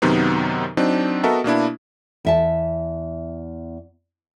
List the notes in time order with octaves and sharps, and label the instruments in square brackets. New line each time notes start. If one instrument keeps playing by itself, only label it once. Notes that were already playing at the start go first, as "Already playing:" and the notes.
[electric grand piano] F#2 C3 D#3 F#3 B3 D#4
F#3 C4 D4 D#4
B3 F#4 A4 A#4 D#5 E5
B2 A#3 D4 E4
[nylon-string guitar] E2 E5 A5